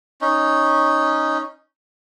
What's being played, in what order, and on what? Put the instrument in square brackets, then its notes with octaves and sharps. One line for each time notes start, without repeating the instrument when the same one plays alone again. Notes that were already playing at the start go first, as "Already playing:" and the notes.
[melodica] C#4 D#4